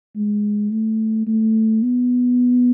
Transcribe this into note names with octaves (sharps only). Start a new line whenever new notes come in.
G#3
A3
A3
B3